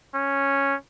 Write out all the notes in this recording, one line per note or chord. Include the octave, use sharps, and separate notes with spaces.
C#4